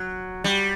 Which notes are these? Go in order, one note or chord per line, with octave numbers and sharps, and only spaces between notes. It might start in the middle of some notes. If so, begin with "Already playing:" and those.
Already playing: F#3
G3